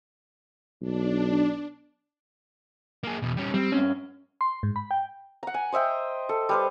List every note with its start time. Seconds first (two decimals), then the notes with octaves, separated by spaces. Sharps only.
0.82 B1 D4
3.04 A#3 G#4
3.23 E2 B2
3.37 G3 C#4
3.54 G3 C4
3.72 G2 C#4
4.41 C6
4.63 G#2
4.76 B5
4.91 G5
5.43 F#5 A#5
5.54 G#5
5.72 C5 D#5 E5 G5
6.29 A4
6.49 G3 B4 C5